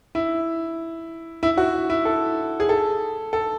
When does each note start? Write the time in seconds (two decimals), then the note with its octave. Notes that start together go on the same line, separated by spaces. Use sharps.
0.15 E4
1.43 E4
1.57 F#4
1.90 E4
2.05 A4
2.60 G#4
2.69 A4
3.33 A4